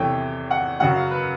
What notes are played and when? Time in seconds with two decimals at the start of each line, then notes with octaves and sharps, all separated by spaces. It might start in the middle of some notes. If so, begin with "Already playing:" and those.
Already playing: E2 C3 E3 A4 C#5 G5
0.51 F#5
0.80 F#2 C#3 F#3 F#5
0.96 F5
1.11 B4